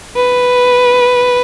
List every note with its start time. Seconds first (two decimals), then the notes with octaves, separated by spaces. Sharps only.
0.16 B4